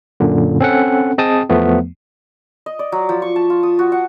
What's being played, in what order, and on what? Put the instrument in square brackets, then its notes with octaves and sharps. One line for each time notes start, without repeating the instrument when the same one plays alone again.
[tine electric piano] F#2 A#2 D3
C4 C#4 A4 F#5
C4 G#4 D#5 G5 A5 D#6
E2 F3 A3 B3
[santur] D#5
D5
F#3
F3
C#6
A5
F4
D#6
F#4
F#5